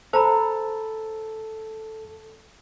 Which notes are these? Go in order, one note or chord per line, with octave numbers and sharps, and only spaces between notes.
A4 C5 A#5 B5